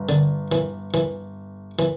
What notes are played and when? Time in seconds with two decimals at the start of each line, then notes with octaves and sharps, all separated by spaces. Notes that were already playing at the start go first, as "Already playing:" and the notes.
Already playing: G1
0.09 D3
0.52 E3
0.94 E3
1.79 E3